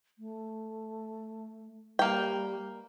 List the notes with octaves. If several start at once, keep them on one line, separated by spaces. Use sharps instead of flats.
A3
G3 A#3 G5